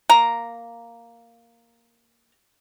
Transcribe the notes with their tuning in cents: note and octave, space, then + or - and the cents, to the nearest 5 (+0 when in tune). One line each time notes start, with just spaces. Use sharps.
A#3 +0 A#5 +0